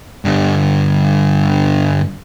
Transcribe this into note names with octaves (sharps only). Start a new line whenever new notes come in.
G2 D3